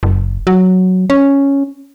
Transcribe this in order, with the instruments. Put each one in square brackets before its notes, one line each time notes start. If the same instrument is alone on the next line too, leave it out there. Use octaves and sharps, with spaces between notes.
[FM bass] F#1
F#3
C#4